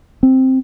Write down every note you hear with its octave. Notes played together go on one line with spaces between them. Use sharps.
C4